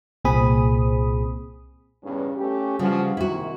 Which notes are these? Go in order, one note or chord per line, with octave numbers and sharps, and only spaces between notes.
C2 A#2 C4 G#4 B5 D#6
E2 G2 C#3
A3 C#4 G4
C#3 E3 F3 G3 F#4
G#2 C3 D#3 E4 F#4